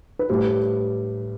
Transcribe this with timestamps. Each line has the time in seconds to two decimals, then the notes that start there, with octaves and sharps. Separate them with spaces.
0.19 B4
0.29 A2 G3 C5
0.44 B4